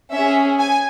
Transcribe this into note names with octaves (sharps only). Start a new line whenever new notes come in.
C#4 G#4 E5
G#5